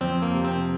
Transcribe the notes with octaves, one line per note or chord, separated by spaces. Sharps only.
F2 C4
A#3
C3
C4